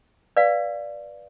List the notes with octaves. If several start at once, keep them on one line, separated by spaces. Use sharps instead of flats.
B4 D5 F5